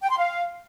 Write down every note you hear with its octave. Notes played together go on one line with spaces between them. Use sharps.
G5
C6
F5